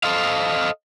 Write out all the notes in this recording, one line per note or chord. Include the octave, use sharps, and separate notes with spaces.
A4 C5 D#5 F5